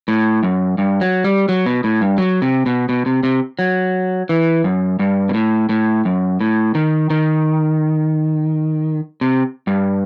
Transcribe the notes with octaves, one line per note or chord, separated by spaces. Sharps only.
A2
F#2
G2
F#3
G3
F#3
B2
A2
G2
F#3
C3
B2
B2
C3
C3
F#3
E3
F#2
G2
B2
A2
A2
F#2
A2
D#3
D#3
C3
G2